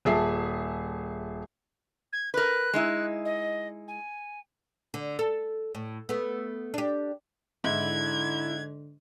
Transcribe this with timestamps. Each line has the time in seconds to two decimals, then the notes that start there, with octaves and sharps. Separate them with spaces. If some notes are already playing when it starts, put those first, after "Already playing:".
0.05 D#1 G#4 E5 A5 C7
2.12 G#6
2.34 A#4 B4 F#6
2.73 G#3 D#4 E4
3.25 D#5
3.87 G#5
4.94 D3
5.19 A4
5.75 A2
6.09 A3 B3
6.74 D4 G4
7.64 G#2 D3 E4 G#6